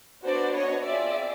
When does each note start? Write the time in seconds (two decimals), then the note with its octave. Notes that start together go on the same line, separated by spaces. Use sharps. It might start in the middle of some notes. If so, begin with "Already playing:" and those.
0.24 B3 D4 F#4 C5 D5
0.54 C#5 D#5
0.84 C4 F4 G#4 D5 E5